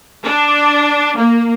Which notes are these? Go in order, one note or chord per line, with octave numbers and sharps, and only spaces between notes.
D4
A#3